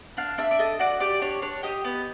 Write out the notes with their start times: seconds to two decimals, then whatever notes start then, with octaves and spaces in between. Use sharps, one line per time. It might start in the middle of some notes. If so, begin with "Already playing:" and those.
0.17 D4 F5
0.38 D4 E5
0.51 D5
0.59 A4 D#5
0.79 F#4 D5
1.00 G4 D5
1.22 D4 C#5
1.42 D4 C#5
1.63 G4 D#5
1.84 B3